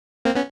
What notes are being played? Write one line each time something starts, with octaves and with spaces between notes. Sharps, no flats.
A#3 C4
B3 C#4